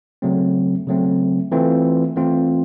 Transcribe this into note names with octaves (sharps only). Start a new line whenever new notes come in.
C#3 F#3 A3 C4
C#3 F#3 A3 C4
E3 A3 C4 F4
E3 A3 C4 F4